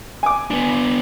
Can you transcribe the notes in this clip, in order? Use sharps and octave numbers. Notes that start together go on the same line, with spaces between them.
G#5 D6
B3 D4